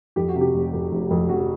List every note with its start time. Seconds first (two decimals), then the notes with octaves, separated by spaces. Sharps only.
0.16 F2 G4
0.28 F#4
0.35 C3
0.41 G4
0.54 F1
0.73 F2
0.92 F1
1.11 F2
1.29 F1 F#4